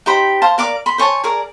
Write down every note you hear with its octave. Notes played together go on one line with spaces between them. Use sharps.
D#4 G4 C5 B5
C5 F5 A5
A#4 D5 F5 D6
B5 C6
C5 C#5 G#5 A5
G#4 A#4 D5